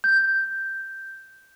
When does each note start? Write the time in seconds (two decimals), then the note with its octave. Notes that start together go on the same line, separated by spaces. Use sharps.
0.04 G6